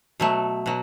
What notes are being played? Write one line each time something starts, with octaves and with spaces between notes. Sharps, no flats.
B2 F#3 A3
B2 F#3